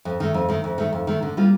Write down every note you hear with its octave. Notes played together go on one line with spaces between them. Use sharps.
F2
D#3 A3
F2
D#3 A3
F2
D#3 A3
F2
D#3 A3
D3
G3 A#3 F4